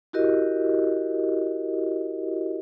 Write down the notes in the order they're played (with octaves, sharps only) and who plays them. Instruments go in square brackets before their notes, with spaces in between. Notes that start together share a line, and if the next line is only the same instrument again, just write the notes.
[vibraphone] E4 F#4 G4 A#4 D#5